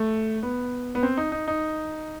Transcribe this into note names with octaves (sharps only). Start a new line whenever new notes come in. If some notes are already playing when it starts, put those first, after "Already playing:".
Already playing: A3
B3
B3
C4
D#4
D#4
D#4